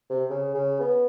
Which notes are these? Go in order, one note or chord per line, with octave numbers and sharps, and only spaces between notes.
C3
C#3
C#3
B3